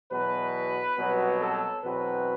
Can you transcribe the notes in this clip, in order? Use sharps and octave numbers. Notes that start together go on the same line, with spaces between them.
E2 B2 F#3 B4
C2 B2 F#3 B3
A4
E2 B2 F#3 C4 B4